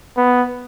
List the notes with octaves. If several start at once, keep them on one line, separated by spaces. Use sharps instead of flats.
B3